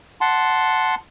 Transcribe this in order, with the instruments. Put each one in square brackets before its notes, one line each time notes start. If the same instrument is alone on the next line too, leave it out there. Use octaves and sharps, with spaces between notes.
[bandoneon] F#5 A5 C6